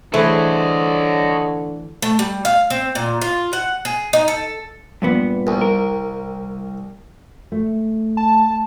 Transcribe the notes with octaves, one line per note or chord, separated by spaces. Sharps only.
D3 E3 A3 G#4 C5 C#5 D#5
A3
G3
F5
C4
A#2
F4
F#5
G#4
D#4
A4
G2 A#2 B3
C2
A#4
A3
A5